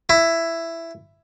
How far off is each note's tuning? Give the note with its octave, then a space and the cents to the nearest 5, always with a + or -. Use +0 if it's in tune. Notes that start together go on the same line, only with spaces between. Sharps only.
E4 +10